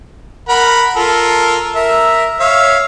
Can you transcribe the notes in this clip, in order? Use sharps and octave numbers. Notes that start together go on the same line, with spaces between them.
A#4 F#5 B5
F4 A4 A#4
A#4 E5
C#5 E5 F5